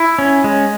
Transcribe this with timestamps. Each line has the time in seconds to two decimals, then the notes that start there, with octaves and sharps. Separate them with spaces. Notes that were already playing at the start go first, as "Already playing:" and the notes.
Already playing: E4
0.18 C#4
0.44 G#3